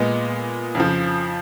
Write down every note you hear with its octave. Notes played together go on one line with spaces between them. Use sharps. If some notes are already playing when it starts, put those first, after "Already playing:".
Already playing: A#2 G#3 B3
F2 C#3 F3